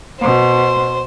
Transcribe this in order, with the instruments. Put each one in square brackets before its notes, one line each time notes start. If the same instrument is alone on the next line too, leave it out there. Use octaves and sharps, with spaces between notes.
[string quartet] B2 [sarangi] C5